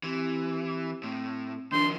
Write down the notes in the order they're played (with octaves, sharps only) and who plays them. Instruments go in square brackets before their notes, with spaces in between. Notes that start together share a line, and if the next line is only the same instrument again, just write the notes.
[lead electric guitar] E3 [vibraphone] C4 E4 G4
[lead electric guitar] A2 [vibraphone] C4
[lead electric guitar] D#3 F3 [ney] D4 [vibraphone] E4 A#4 [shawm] C6